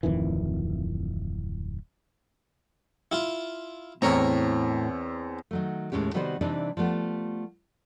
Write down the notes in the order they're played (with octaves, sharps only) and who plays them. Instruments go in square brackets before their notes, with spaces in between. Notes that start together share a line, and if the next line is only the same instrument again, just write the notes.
[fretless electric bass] D1 F2 D#3 E3
[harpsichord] E4 F4
[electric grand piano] E2 C4 [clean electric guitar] A2 [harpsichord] A#4 C#5 A#5
[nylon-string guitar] D#3 F#3 A3
D#2 A2 G#3 C#4 G4
C3 D#3 G3 B3 F#4 C5
C3 E3 G3 C4 D4 D#4
F3 G3 A3 B3